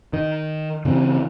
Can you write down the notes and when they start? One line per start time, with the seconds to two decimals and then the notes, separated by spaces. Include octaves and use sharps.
0.13 D#3
0.85 C#3 E3 C4